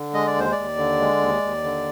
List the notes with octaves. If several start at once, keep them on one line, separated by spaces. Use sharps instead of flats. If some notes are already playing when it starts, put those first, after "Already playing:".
Already playing: D3
G#3 D#5
D5
D#2 C5
D5
D#2
D3
G#3
D#2
D#2
D3